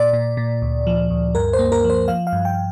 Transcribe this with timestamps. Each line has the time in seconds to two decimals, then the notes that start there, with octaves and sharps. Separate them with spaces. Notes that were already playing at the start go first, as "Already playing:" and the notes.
Already playing: A#2 D5
0.13 A#2
0.37 A#2
0.62 D2
0.87 F3
1.10 D2
1.35 G2 A#4
1.53 C5
1.59 A#3
1.72 A#4
1.84 F3
1.90 C5
2.08 F3 F5
2.27 F5
2.33 G2
2.45 G5